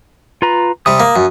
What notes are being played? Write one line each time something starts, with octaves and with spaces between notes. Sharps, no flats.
F4 B4 A#5
C3 G3 D#6
A#3
F#2